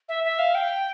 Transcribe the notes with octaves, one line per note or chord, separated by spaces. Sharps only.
E5
E5
F5
G5